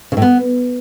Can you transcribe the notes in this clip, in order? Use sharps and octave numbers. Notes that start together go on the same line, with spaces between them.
C#3
A2
B3